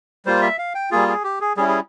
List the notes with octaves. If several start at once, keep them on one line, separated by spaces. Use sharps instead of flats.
G3 A#3 F4 C5
E5
F5
G5
G3 A#3 F4 G#4
G#4
G4
G#4
G3 C#4 E4 G#4
G#4